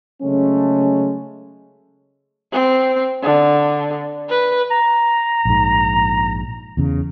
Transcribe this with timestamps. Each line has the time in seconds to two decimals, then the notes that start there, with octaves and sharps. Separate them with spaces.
0.22 C#3 F#3 G#3 A3 C#4
2.53 C4
3.22 D3
4.29 B4
4.71 A#5
5.45 A#1 G#2
6.77 E2 C#3